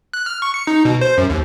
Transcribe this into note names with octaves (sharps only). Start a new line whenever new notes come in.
F#6
F6
C#6
C#7
D#4
B2
C5
F#2
D#2